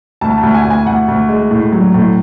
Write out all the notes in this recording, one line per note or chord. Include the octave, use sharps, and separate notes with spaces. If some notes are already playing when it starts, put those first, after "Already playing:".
D2 A5
A5
D2
G#5
D2
G#5
D2 F#5
D2
G#3
A2
F#3
A2